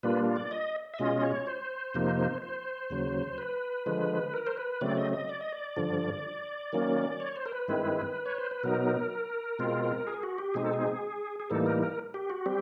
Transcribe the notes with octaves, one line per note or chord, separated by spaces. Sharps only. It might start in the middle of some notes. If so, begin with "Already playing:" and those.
A#2 G3 A#3 D4 F4 B4
D5
D#5
E5
B2 G#3 C#4 F4 D#5
C#5
C5
F2 C3 F3 A#3 D#4
C5
D#2 C#3 F#3
B4
D3 F3 G#3
A#4
C5
B4
C#3 F#3 A3 C4 D5
D#5
D#5
D5
D#5
D5
G2 D3 F3
D#3 F#3 A#3 C#4
C#5
C5
A#4
B4
G2 D#3 G#3 C4 E4
C#5
C5
B4
B2 F#3 B3 D#4 A#4
B2 G#3 C4 F4
G#4
F#4
G4
B2 G#3 C4 D#4 G#4
A4
G#4
G#4
A2 E3 G3 A#3 D#4 A4
A#4
A#4
G4
F#4
G3 C4 G4